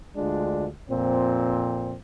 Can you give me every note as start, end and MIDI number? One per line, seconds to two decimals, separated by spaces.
0.16 0.66 38
0.16 0.66 56
0.16 0.66 62
0.16 0.66 65
0.89 1.94 41
0.89 1.94 46
0.89 1.94 60